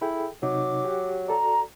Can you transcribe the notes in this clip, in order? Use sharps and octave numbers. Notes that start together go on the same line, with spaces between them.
E4 G#4 A4 G5
C3 F#3 D#4 D6
G4 F#5
F#4 A4 D5 A#5